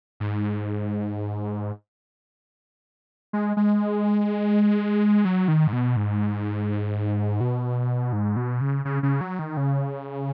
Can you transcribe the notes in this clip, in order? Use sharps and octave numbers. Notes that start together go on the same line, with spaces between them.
G#2
G#3
G#3
F#3
D#3
G#2
B2
G#2
B2
G#2
B2
C#3
C#3
C#3
F#3
D#3
C#3